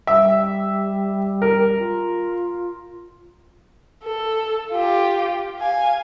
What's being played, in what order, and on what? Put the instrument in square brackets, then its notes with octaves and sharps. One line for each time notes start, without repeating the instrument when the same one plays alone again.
[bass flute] G3 [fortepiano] E5
[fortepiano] A#4
[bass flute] F4
[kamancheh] A4
F4 G4
F5 G#5